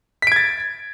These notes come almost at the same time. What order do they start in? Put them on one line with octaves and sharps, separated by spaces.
B6 D7 G#6 A6